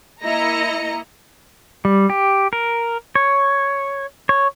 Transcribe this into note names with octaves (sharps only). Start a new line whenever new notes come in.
A#3 E4 D#5 A#5 A#6 C#7
G3
G4
A#4
C#5
C#5